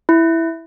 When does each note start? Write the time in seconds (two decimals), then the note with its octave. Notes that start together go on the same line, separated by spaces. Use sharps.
0.09 E4